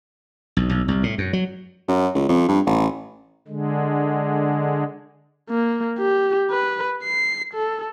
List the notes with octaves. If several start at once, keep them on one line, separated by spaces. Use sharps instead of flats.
B1
B1
C2
A2
F#2
F#3
F#2
C#2
F2
G2
A1
D3 G#3
A#3
G4
B4
C7
A4